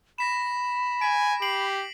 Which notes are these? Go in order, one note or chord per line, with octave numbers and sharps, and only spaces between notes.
B5 A#6 B6 E7
G#5 B6 D7
G4 C7 D7 F#7